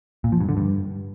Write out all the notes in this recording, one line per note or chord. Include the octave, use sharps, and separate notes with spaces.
A#2
F3
G2
D3
G2